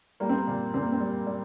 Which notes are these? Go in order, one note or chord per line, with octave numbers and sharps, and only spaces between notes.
G3 A#3
C4
A#3
A#2
A#2 C4
A#3
C4
G3
G3